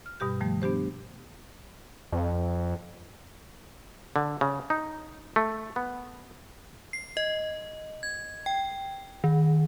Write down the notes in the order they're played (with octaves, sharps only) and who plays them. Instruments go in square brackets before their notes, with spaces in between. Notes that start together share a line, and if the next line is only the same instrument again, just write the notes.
[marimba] F6
G2 B2 G3 G4 G6
D#3 F3 G3 A3
B3 D4 G4 C5
[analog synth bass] F2
[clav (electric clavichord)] D3
C#3
D#4
A3
B3
[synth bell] C7
D#5
G#6
G5
D#3